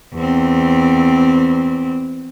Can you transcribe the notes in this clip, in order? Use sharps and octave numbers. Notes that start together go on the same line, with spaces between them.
E2 C4